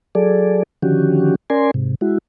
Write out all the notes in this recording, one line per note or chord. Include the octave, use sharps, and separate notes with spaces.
F#3 G#4 A4 D5
D3 D#3 F3 C#4 F#4 G4
C#4 A#4 D5 G#5 C6
G#2 C3
G#3 E4 F#4